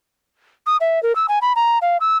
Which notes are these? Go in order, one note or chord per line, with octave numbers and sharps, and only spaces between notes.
D#6
E5
A#4
E6
G#5
B5
A#5
F5
E6